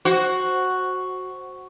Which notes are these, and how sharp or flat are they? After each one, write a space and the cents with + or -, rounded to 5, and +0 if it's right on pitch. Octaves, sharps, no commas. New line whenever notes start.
F#4 +0 C5 +10